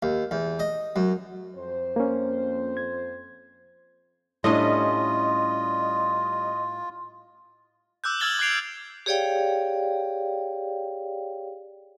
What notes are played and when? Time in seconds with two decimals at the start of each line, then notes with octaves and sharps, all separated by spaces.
0.03 D#2
0.31 E2
0.59 D#5
0.96 F#2
1.56 F2 C5
1.96 A#3 C#4
2.77 G#6
4.44 A2 G3 C#4 D4 F4 D#5
8.04 D6 E6 F#6 G6
8.20 E6 F6 G#6 A6 F#7 G7
8.39 D6 F#6 G#6 C7 D7 F7
9.06 G4 G#4 C#5 D5 F5 G5